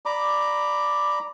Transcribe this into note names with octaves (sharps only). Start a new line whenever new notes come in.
D5 A#5 B5 D6